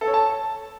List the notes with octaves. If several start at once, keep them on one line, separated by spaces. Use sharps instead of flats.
A4
C#5
A5